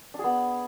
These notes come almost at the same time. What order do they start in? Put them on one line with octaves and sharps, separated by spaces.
D4 G#4 B3